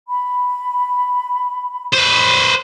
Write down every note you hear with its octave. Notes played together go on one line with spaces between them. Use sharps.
B5
B4 C5